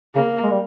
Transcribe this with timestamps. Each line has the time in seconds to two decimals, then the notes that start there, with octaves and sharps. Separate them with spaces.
0.15 C#3 A#3
0.43 G#3
0.51 G3